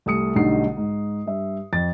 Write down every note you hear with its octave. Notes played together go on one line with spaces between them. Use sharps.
C2 A3 D#6 C#7
B1 D3 G3 A3 D#4 C7
G#2
G2 E5
F2 A6